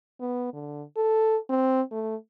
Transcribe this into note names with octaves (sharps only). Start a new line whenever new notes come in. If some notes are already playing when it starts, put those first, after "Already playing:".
B3
D3
A4
C4
A3